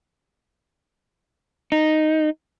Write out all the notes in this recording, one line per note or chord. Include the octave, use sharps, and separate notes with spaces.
D#4